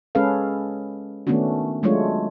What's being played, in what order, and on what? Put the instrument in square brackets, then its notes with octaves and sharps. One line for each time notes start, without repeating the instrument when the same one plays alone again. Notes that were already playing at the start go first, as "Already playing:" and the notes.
[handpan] G#3 C#4 G#4 A4 B4 F5
D#3 A3 B3 C#4 D4 F#4
F#3 G#3 A3 D4 F4 C#5